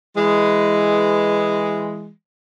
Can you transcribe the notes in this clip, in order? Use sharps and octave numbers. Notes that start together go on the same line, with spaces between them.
E3 G#3